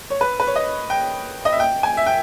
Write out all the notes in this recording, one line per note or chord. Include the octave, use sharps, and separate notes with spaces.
C#5
B4
B4
C#5
D#5
G5
D#5
E5
G5
G#5
E5
G5